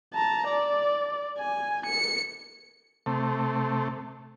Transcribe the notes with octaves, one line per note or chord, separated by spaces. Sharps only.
A5 A#5
D5
G#5
C#7
C3 A3